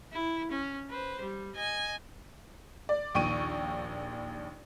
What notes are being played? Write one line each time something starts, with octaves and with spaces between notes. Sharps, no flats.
E4
C#4
B4 C5
G3
D#5 G#5
D5
A#1 D#2 G5 C#6 D7 D#7